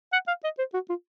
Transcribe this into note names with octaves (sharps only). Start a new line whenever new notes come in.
F#5
F5
D#5
C5
F#4
F4